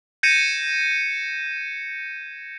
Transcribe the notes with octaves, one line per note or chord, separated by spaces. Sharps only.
G6 G#6 A#6 C#7 D#7 E7